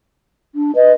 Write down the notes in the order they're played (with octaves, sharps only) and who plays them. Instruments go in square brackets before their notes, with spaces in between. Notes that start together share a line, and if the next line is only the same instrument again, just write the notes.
[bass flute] D4
[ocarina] B4 [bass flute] D#5